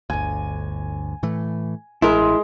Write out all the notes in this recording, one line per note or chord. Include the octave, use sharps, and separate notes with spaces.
G1 D2 G#5
A2 E3 A3
A1 G#3 E4 A#4